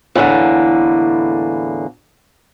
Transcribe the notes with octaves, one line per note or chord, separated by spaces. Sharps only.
E2 A2 D3 A#3